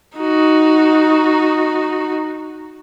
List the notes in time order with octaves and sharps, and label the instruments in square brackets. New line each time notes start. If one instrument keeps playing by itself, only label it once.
[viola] D#4 F#4